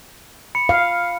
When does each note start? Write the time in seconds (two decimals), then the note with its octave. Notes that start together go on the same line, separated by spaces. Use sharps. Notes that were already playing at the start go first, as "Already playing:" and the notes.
0.55 B5 C#7
0.69 F5